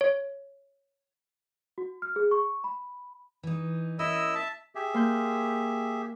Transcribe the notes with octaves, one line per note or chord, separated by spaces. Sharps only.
C#5
F#4
F6
G#4
C#6
B5
E3 D#4
A#3 C#4 E4 D#5 E6
E5 A5
G4 G#4 E5
A#3 C6 G6